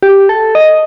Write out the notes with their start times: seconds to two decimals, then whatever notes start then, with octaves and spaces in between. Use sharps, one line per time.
0.02 G4
0.29 A4
0.55 D#5